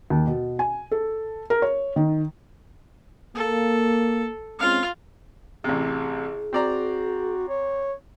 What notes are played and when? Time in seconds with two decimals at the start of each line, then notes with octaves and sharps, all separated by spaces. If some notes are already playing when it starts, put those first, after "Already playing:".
0.10 D#2
0.27 B2
0.59 G#5
0.92 A4
1.50 A#4
1.62 C#5
1.96 D#3
3.35 A#3 A4
4.59 G#3 C4 C#4 F4 F5
5.64 A1 C3 G#4
6.53 C4 F#4 D5 A#5
7.49 C#5